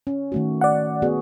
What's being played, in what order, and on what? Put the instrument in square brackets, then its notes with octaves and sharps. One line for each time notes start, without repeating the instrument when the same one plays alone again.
[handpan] C#4
D#3 A3 F#4
[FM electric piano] D5 F#5
[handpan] B3 F#4 G#4